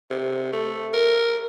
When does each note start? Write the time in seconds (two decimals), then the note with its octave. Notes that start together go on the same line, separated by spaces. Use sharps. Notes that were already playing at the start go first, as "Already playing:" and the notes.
0.10 C3
0.53 A3
0.93 A#4